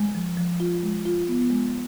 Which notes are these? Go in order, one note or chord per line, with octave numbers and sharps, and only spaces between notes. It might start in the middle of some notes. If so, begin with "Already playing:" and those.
Already playing: G#3
F3
F3
F4
G#3
F4
B3
G#3